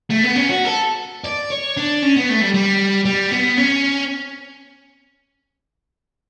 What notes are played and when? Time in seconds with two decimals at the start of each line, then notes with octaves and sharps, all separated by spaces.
0.10 A3
0.23 B3
0.35 C#4
0.49 F#4
0.65 A4
1.25 D5
1.51 C#5
1.77 D4
2.03 C#4
2.16 B3
2.29 A3
2.41 G3
2.54 G3
3.05 G3
3.31 B3
3.57 C#4